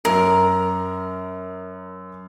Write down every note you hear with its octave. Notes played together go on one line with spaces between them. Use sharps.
F#2 A#4 A#5